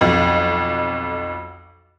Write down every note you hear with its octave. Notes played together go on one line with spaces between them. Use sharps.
B1 F2